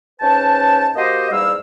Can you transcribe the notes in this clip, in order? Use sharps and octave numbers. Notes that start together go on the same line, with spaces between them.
G#2 C#4 B4 G5 A5
A#3 F#4 G4 C5 D#5
E2 G#2 G3 A#3 F5 E6